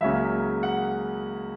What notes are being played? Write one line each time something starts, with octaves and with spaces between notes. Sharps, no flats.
C#2 C#3 F#3 A#3 C#4 E5
F#5